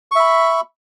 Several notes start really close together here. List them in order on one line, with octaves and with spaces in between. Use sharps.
C#6 E5 B5